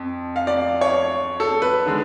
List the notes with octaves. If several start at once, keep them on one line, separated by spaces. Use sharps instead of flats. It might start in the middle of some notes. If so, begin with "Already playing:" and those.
Already playing: F2
F5
D5
C#5
A4
B4
D3 G#3